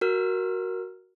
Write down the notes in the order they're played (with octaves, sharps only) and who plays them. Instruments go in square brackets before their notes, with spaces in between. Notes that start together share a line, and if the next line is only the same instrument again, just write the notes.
[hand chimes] F#4 A#4 F6